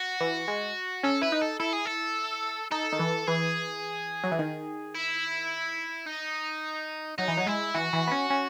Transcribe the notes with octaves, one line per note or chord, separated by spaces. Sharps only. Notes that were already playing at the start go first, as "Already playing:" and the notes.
Already playing: F#4
E3
G#3
C#4 A4
E4 B4
D#4
A4
E4 A4
G#4
A4
D#4 A4
D#3
E3
E3 G#4
F#3
E3
D#3
E4
D#4
F#3 D#4
E3
F#3
G#3 E4
E3 F#4
E3
B3
C#4
C#4